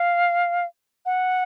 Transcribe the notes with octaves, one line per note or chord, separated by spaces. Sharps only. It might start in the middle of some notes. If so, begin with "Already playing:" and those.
Already playing: F5
F#5